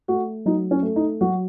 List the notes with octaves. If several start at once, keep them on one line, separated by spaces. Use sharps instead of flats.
A3 F#4
F#3 D#4
C#4
A3
D#4
F#3 F#4